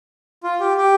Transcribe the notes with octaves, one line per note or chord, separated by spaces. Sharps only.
F4
G4
G4